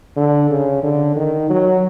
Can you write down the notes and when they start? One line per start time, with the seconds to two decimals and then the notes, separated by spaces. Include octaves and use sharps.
0.17 D3
0.50 C#3
0.83 D3
1.16 D#3
1.50 F#3